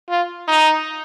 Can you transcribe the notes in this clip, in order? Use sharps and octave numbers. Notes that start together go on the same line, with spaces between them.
F4
D#4